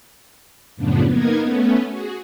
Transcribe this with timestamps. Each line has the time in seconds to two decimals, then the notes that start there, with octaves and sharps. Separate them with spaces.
0.76 F#2 A2 C#3 F3 B3 D4
1.07 A#3 B3 D#4 A#4 G#6
1.39 A3 B3 C#4
1.88 F#4 G#4